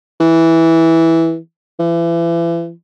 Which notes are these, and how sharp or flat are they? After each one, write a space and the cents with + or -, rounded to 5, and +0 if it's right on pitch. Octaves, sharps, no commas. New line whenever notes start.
E3 -10
E3 +35